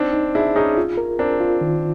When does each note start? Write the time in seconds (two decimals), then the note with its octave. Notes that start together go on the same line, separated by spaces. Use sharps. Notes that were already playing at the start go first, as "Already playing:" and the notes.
Already playing: C4 D4 D#4
0.13 D#4
0.35 D4 E4 G#4
0.56 C#4 D#4 G#4
0.78 F4
0.98 A#4
1.19 C4 D4 A#4
1.41 F4
1.61 D#3